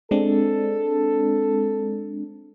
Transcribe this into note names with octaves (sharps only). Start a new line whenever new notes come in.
G#3 C4 D4 A4